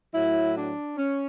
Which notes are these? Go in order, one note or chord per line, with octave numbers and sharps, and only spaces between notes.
A2 F#3 E4
D4
C#4